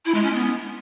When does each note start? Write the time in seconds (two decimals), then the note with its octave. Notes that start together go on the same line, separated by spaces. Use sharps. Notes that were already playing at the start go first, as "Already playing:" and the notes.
0.05 E4
0.14 G#3
0.24 C#4
0.33 B3